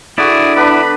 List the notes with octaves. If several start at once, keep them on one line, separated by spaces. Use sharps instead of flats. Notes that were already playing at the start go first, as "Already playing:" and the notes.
D3 E4 F#4 G#4 D5
B3 D4 B4 B5